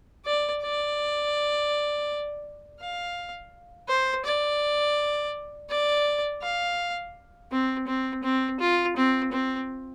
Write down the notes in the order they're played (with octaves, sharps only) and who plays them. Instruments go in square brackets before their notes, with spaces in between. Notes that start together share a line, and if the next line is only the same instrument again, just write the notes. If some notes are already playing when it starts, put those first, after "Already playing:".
[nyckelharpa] D5
D5
F5
C5
D5
D5
F5
C4
C4
C4
F4
C4
C4